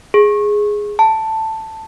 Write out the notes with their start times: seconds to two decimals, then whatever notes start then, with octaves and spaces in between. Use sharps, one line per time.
0.14 G#4
0.99 A5